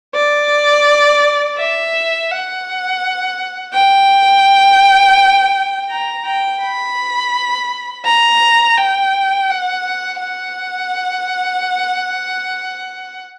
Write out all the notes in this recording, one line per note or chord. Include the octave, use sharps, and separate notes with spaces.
D5
E5
F#5
G5
A#5
G5
B5
A#5
G5
F#5
F#5